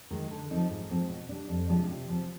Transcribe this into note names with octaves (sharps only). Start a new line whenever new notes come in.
D#3 G#3
D3
F3 C4 D#4
G#2
F3 G#3 C4
B2
G3 D4
F2
C3 F3 G#3 D4
C3
F3 C4